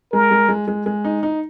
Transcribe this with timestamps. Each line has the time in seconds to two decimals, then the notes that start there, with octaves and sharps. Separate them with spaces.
0.12 G#3 A#4
0.31 G#3
0.49 G#3
0.68 G#3
0.86 G#3
1.05 D#4
1.23 D#4